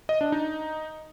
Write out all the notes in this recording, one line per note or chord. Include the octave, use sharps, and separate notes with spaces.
D#5
D4
D#4